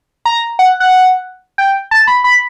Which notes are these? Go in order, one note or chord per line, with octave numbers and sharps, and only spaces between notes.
A#5
F#5
F#5
G5
A5
B5
B5